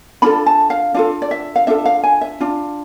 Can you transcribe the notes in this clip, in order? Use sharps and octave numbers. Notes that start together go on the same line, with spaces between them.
D4 F4 A4 B5
A5
F5
D4 F4 A4 F5
D5
E5
F5
D4 F4 A4 E5
F5
G#5
E5
D4 F4